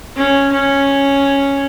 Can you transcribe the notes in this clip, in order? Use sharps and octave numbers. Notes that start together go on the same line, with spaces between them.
C#4
C#4